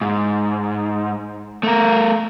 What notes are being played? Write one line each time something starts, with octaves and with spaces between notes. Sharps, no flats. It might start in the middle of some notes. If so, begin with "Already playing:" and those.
G#2
A3 A#4